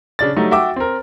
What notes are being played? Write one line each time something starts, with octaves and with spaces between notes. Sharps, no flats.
C#3 D4 A6
F#3 G3 A3 D#4
F#4 E5 G5 D6 E6
C4 A#4